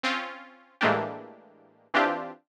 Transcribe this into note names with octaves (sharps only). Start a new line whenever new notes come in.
C4 C#4 F4
A2 E3 G#3 A#3 D4 G4
E3 C4 D4 F4 G4